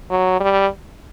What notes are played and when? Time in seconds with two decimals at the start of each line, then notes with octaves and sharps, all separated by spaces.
0.10 F#3
0.40 G3